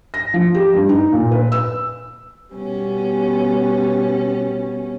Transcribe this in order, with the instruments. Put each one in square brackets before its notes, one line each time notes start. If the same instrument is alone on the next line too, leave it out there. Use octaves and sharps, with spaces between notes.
[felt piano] A#6
F3
G4
G2
D#4
A#2
B4
E6
[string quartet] B2 G3 B3 C#4